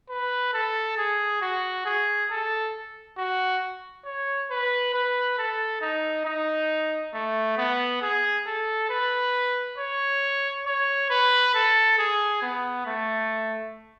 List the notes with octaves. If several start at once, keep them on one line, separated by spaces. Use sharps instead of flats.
B4
A4
G#4
F#4
G#4
A4
F#4
C#5
B4
B4
A4
D#4
D#4
A3
B3
G#4
A4
B4
C#5
C#5
B4
A4
G#4
B3
A3